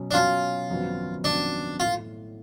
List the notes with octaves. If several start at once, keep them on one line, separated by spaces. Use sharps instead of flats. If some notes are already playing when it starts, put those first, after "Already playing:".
Already playing: B2 F#3 C#4
D4
B2 F#3 C#4 F4
G#1 F#2 F3 B3 F#4
G#1 F#2 F3 B3 D4 F#4
A2 F4